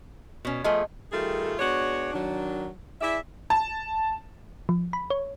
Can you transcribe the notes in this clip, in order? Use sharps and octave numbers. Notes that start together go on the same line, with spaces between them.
B2 C#4
F3 A3 G#4 D#5 A5
D#3 G3 A3 F4 G#4 A4
G#3 B3 D4 F#4 C#5
D#3 F#3 D4
E4 G#4 D5 E5
A5
F3
B5
C#5